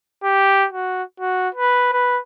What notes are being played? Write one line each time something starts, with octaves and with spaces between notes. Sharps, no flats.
G4
F#4
F#4
B4
B4